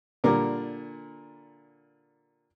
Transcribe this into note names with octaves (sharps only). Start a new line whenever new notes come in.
A#2 D3 G3 A#4 D6